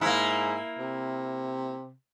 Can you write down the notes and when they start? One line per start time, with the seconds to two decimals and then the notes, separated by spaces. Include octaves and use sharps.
0.01 G#2 A#3 E4
0.79 C3